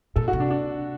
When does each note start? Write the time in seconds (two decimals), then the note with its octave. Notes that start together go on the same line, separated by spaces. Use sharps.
0.16 A#2 A4
0.28 F#4
0.33 C3
0.40 D4
0.50 D4